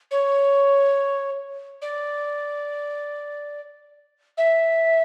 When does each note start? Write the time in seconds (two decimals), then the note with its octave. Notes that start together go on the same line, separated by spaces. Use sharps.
0.11 C#5
1.82 D5
4.37 E5